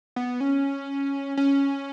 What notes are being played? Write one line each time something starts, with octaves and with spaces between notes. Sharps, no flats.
B3
C#4
C#4